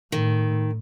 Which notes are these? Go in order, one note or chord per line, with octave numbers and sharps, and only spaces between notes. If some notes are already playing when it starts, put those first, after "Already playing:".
A2 D#3